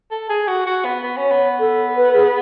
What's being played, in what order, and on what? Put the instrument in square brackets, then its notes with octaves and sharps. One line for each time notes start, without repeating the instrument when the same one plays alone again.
[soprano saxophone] A4
G#4
F#4
F#4
B3
B3
C#4
[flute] C#5
[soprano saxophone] B3
[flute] A4
B4
G#4